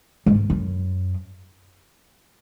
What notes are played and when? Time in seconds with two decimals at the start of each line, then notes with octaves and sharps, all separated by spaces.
0.26 G#2
0.50 F#2